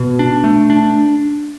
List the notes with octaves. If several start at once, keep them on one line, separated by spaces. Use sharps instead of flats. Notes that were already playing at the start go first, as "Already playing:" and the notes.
Already playing: B2
D4
A3
D4